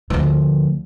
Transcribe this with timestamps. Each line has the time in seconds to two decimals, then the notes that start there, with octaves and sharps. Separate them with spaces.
0.10 D2 F3